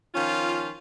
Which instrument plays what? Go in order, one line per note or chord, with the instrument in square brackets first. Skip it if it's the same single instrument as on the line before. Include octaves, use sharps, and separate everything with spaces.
[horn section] D#3 F3 C#4 F4